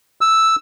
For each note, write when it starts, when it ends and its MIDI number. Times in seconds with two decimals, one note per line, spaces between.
0.21 0.56 88